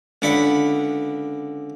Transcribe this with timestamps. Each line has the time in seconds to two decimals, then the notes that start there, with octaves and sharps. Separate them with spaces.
0.22 C#2 D3 F#5 B5